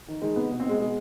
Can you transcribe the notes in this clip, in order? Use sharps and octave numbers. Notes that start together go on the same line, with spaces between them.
D#3
D#3 G#3
C3 B3
B2
C4
B2 G#3
B2 G#3